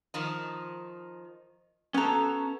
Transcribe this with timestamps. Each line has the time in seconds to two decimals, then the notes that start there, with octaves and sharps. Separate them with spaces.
0.14 D#3 F3 D#4
1.94 B3 C#4 A4 A#5